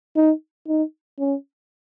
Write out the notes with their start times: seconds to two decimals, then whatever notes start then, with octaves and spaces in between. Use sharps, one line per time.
0.16 D#4
0.68 D#4
1.19 C#4